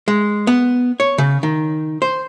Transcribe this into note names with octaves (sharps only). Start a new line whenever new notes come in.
G#3
B3
C#5
C#3
D#3
C5